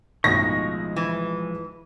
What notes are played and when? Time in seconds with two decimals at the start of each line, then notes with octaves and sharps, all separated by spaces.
0.24 B1 A2 D#3 F3 G#3 C#6 A#6
0.96 E3